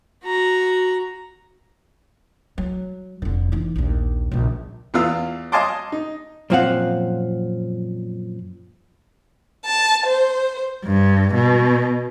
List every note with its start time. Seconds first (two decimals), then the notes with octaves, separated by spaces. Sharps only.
0.24 F#4 A#5
2.58 F#3
3.22 F1 D3
3.52 E3 D#4
3.76 A#1 D#2
4.31 A#1 C#3
4.94 E2 B3 F4 F5 E6
5.52 D#5 F5 G#5 A5 C6 D6
5.92 D#4
6.50 F#2 A#2 F3 C4 F5 F#5
9.66 A5
10.07 C5
10.85 G2
11.36 B2